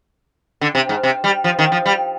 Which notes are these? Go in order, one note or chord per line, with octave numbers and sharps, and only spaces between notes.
D3
C3
G#2
C3
G3
F3
D#3
F3
G3